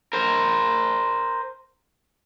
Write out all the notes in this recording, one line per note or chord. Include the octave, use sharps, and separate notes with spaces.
A#4 C5